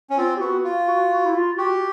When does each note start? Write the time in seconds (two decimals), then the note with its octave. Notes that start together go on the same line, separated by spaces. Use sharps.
0.10 C#4
0.17 C4 F4
0.37 G4
0.40 B3 F#4
0.64 F4
0.87 F#4
1.11 F#4
1.25 E4
1.34 F4
1.57 F#4 G4